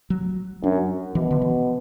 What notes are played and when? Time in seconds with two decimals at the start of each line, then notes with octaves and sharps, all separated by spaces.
0.10 F#3
0.63 F#2 D4
1.15 B2 E3
1.31 D3
1.42 E3